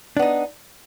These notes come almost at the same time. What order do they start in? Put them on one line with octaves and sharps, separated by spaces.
D4 B3 D#4